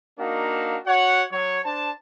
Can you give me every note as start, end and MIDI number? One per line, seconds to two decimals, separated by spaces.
0.19 0.76 58
0.19 0.76 62
0.19 0.76 63
0.19 0.76 66
0.19 0.76 77
0.86 1.23 66
0.86 1.23 73
0.86 1.23 78
1.32 1.59 54
1.32 1.59 73
1.64 1.90 62
1.64 1.90 72
1.64 1.90 81